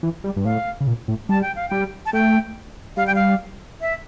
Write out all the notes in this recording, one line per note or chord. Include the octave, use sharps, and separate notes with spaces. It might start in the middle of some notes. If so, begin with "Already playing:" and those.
E3
G3
G2
A2 F5
C#3
A#2
A2
G3 A5
G5
F5
G3 G5
A5
A3 G5
G3 F5
G5
F5
E5